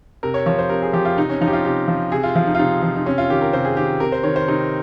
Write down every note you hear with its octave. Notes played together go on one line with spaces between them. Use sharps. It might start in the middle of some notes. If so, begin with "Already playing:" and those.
C3 A#4
C#5
F3 C#5
C5
C3 A#4
G#4
F3 G4
F4
C3 D#4
C#4
F3 D#4
G4
F4
C3 G4
F3
C3 G#4
F4
F3 F4
D#4
F4
C3 D#4
F3
D#4
C3 C#4
F4
D#3 G4
A#4
C3 C5
G#4
D#3 G4
C3 A#4
C5
D#3 C#5
C5
C3 D#4